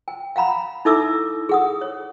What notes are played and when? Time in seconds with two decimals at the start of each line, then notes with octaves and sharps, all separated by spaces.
0.08 G5
0.36 F5 F#5 A#5 B5
0.85 D#4 E4 A4 E5 D6 E6
1.49 G#4 F#5 D#6
1.81 C#5